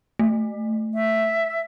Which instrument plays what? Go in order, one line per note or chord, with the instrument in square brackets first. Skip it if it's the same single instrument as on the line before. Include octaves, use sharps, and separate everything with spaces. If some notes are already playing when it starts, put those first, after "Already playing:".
[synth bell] A3
[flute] E5